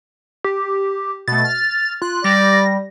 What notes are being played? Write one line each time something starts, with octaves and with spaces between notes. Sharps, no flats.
G4
B2 A3 A6
F6
F4 F#6
G3 D5 A#6